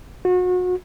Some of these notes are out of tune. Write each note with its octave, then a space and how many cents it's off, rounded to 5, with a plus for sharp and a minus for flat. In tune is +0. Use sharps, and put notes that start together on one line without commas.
F#4 -35